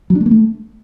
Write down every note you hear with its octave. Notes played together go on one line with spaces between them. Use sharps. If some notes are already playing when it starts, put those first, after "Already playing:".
F#3
D4
A3
A#3
A3